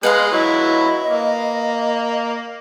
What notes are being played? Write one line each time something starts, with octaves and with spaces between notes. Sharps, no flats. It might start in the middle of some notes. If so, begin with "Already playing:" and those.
G#3 B4 D#5 F5 C6
F#3 E4 D#5
A#3